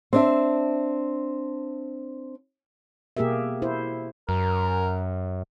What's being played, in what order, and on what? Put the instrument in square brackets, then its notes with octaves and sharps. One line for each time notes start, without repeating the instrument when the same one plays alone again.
[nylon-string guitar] C4 D4 E5
[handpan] B2 A#3 G4 G#4 A#4 E5
E4 C5
[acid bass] F#2 [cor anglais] A#4